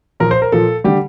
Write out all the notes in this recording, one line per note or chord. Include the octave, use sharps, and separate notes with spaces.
A#2 F3 A#4
C5
A#4
A#2 F3 A4
D3 G3 G4